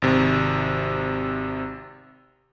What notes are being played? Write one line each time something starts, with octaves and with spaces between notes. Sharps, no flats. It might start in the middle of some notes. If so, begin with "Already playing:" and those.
G#1 C3